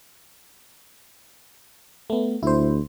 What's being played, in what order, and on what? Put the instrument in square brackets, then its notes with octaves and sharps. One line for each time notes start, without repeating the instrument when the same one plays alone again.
[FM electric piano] A3 B3
[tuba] D2 [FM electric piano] E4 C5